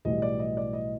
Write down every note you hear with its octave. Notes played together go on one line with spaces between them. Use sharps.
B1 A2 E3 G3 D#5
D5
D#5
D5
D#5